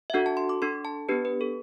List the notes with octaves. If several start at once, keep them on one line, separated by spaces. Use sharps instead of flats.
E5
D4 F#4 A4 F#5
A5
C6
D6
D4 A4 C6
A5
B3 D4 G4 B4
B4
A4